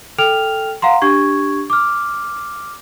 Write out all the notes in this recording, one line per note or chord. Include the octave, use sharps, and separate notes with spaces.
A4 G5 F6 F7
F5 F#5 A#5 C6
D4 G4 C#6 G#6
D6 F6